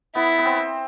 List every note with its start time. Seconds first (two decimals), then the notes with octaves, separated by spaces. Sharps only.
0.15 B3 E4
0.38 B3
0.45 C4